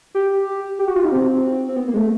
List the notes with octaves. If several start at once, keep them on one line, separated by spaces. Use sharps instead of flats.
G4
G4
F#4
F4
D#4
C4
C4
B3
A#3
G#3
A3